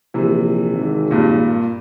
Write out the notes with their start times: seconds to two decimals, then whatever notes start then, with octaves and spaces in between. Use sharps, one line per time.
0.14 A#1 C3 E3
0.73 G#1
1.11 G2 A#2